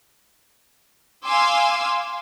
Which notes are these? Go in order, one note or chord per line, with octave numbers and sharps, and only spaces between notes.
F5 G#5 C6 D6 E6